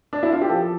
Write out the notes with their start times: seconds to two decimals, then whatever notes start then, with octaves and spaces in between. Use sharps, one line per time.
0.13 D4
0.23 E4
0.32 F4
0.41 G4
0.49 F3 A4